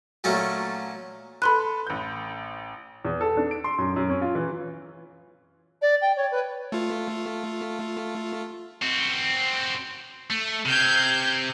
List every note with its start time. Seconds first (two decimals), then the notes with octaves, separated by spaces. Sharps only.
0.24 A#2 F#3 A3 C#4 A4
1.42 A4 B4 B5 C6 F#6
1.87 A1 G6
3.05 E2
3.21 A4
3.37 D4
3.51 D7
3.64 C6
3.78 F#2
3.96 F#2
4.09 C#4
4.22 F4
4.35 E3
5.82 D5
6.01 G5
6.17 C#5
6.32 B4
6.72 A3 F4
8.82 C4 F#4
10.30 A3
10.65 C3 F6 G6 G#6